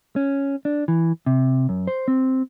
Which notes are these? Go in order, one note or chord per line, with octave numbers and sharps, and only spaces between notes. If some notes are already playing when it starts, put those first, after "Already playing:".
C#4
D4
E3
C3
F#2
C5
C4